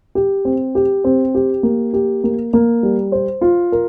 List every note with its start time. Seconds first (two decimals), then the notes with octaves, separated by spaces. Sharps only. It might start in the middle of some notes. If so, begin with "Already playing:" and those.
0.15 G4
0.45 C4
0.75 G4
1.04 C4
1.35 G4
1.63 A#3
1.93 G4
2.24 A#3
2.53 A#3
2.83 G3
3.12 C5
3.41 F4
3.72 A#4